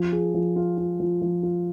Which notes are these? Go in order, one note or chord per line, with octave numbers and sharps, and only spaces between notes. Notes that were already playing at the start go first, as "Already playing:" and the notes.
Already playing: F3
G#4
F3
F4
F4
F3
F3
F4